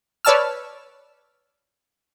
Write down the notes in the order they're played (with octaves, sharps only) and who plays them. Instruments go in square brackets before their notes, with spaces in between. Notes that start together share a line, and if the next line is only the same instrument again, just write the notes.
[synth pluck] B4 C#5 D5 A5 E6 F6